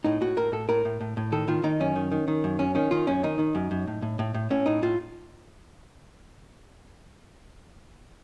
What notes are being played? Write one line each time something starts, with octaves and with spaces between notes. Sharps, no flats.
A2 D#4
A2 F#4
A2 A#4
A2 A4
A2 A#4
A2
A2
A2
D#3 A4
D#3 F4
D#3 D#4
F#2 C#4
D#3
D#3
D#3
F#2
F#2 C#4
D#3 C#4
D#3 F4
F#2 C#4
D#3 D#4
D#3
F#2
F#2
A2
A2
A2
A2
A2 C#4
A2 D#4
A2 F4